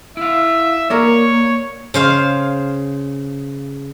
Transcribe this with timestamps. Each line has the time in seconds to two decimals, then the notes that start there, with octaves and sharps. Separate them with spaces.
0.17 E4 E5 F5
0.90 A#3 A#4 C#5 D5
1.94 C#3 C5 F5